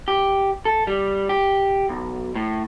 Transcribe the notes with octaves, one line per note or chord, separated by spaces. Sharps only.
G4
A4
G3
G4
B1
A2